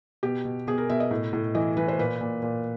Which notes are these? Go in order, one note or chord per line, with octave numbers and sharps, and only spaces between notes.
B2 G4
B2
B2 G#4
A#4
B2 E5
D#5
A2
A2
E3 D#5
E3 B4
C5
A#2 B4
A#2
A#2